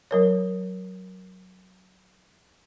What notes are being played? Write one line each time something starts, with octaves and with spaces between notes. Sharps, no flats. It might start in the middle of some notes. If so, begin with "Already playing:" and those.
F#3 A#4 C#5